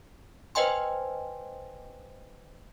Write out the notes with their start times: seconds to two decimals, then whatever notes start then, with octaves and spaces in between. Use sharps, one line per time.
0.55 B4 C5 D#5 G5 G#5 C6